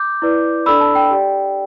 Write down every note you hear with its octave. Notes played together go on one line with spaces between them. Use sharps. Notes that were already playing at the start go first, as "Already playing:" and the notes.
Already playing: D6 G6
E4 B4 D5
D4 A4 D5 B5 E6
A5
G5
G4 D5